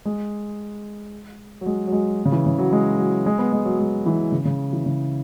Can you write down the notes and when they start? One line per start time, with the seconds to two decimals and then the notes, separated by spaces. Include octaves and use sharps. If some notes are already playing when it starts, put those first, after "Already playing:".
0.05 G#3
1.61 F#3
1.66 G#3
1.87 F#3
1.92 G#3
2.25 C#3
2.32 E3
2.46 C#3
2.58 F#3
2.73 G#3
2.98 F#3
3.26 G#3
3.39 B3
3.53 G#3
3.65 F#3
3.80 G#3
4.06 E3
4.32 C#3
4.45 C#3
4.73 E3
4.86 C#3